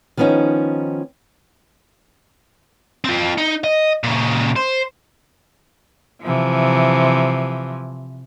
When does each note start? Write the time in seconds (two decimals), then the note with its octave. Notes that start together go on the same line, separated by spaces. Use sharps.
0.17 D#3 F3 B3 C#4 D#4
3.04 C4 F4
3.38 D#4
3.64 D#5
4.04 A#2 C#3
4.56 C5
6.23 C3 E3 F3